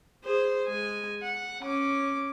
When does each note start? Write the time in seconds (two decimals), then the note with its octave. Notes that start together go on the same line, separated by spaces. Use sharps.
0.24 G#4 C5
0.67 G#3 G#5
1.22 F#5
1.62 C#4 D6